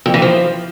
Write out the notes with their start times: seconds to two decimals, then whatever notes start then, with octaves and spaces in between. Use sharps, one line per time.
0.06 F2
0.14 E3
0.22 F3